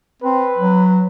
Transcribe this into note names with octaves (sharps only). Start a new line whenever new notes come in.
C4 B4
F#3